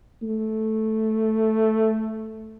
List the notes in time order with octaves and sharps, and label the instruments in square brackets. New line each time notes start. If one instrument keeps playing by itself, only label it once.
[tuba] A3